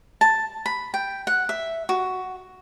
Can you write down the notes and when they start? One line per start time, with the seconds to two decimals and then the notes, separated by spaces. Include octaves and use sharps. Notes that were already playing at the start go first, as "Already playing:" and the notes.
0.21 A5
0.66 B5
0.94 G5
1.27 F#5
1.49 E5
1.89 F#4